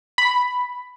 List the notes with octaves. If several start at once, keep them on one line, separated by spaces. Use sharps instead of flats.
B5